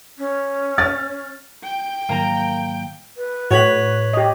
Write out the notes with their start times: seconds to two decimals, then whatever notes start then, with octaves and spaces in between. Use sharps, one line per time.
0.18 C#4
0.78 F6 A6
1.63 G5
2.09 G#2 D#3 F#3 A#3 A#5
3.17 B4
3.51 A2 F#4 C#5 B5
4.13 G4 D#5